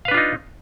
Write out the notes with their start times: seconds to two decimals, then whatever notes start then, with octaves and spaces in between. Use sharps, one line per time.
0.05 F5
0.08 B4
0.11 D4
0.14 F4
0.18 D#4